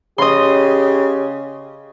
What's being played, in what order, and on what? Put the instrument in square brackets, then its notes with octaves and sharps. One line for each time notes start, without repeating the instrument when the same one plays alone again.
[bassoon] C#3 [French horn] G4 [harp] D#5 C6